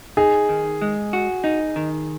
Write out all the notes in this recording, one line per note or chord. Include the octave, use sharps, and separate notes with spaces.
D#4 G#4
D#3
G#3
F#4
D#4
D#3